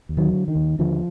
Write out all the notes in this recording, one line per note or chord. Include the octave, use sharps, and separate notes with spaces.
D#2
D#3 F#3
D3
D#3
D#2
D#2 D3 F3